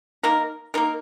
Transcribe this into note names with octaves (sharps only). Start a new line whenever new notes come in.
A#3 D#4 A#4
A#3 D#4 A#4